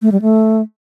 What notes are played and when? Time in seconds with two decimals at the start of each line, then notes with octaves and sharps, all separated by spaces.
0.02 A3
0.12 G3
0.22 A3